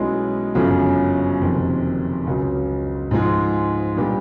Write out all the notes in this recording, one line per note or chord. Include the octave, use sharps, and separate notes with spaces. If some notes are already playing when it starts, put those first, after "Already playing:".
Already playing: B1 B2 G#3 C#4 E4
G1 F#2 C#3 F3
F#1 F2 C3 D#3
C#2 C#3 F#3
G#2 F3 G#3
A#2 G3 B3 D4 G4